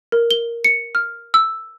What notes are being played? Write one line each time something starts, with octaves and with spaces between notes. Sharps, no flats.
A#4
G7
C#7
F6
E6